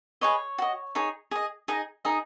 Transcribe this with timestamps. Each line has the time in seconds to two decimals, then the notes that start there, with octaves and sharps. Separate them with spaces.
0.21 G#4 B4 C#5 D#5 C#6
0.58 F#4 D#5
0.95 D#4 G#4 C#5
1.31 G#4 D#5
1.68 D#4 G#4 D#5
2.05 D#4 G#4 D#5